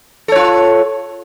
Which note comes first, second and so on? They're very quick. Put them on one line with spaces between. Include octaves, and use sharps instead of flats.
A4 C#5 F4